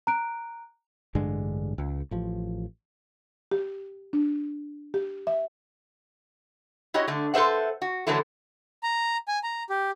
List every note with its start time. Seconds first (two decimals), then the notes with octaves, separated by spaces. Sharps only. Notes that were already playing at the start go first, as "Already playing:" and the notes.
0.07 A#5 F#6 D7
1.15 A1 G2 D3 G#3
1.78 C#2
2.11 A1 F3
3.51 G4
4.13 D4
4.94 G4
5.27 E5
6.94 E4 F#4 G4 C#5 D#5
7.07 D3 A3
7.34 A4 B4 C5 E5 F#5
7.82 F#4
8.07 D3 E3 F#3 A3 E4 A4
8.83 A#5
9.28 G#5
9.43 A#5
9.70 G4